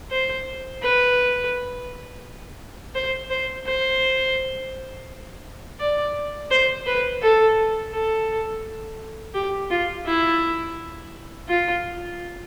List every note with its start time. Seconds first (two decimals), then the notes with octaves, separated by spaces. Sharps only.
0.11 C5
0.82 B4
2.95 C5
3.30 C5
3.66 C5
5.80 D5
6.51 C5
6.86 B4
7.22 A4
7.92 A4
9.35 G4
9.71 F4
10.06 E4
11.49 F4